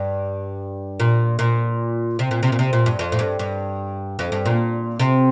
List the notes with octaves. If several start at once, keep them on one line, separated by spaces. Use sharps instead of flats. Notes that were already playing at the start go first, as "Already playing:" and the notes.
Already playing: G2
A#2
A#2
C3
A#2
C3
A#2
C3
A#2
G2
F2
A2
G2
G2
F2
G2
A#2
C3